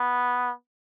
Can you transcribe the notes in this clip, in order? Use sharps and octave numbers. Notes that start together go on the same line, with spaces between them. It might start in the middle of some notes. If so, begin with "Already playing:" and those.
Already playing: B3